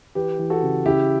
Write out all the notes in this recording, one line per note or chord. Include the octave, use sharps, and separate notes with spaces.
E3 G4 B4
E3
F#4 A4
C#3
C#3 E4 G4